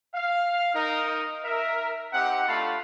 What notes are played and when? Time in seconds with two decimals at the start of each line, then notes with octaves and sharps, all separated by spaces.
0.14 F5
0.74 D#4 A#4
1.44 A#4 E5
2.13 C4 D#4 G4 F#5
2.48 A3 D4 F4 F5 A5 B5